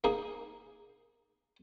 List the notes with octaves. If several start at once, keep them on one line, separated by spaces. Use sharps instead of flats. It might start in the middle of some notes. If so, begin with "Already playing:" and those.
A#3 D#4 G#4